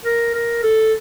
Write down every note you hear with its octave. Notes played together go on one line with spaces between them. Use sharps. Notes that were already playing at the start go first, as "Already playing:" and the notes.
A#4
A#4
A4